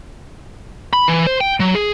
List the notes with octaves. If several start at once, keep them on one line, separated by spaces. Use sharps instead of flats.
B5
E3
C5
G5
F#3
G#4